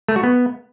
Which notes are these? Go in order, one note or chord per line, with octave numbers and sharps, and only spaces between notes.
A3
F#4
B3